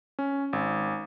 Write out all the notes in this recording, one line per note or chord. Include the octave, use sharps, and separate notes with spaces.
C#4
G#1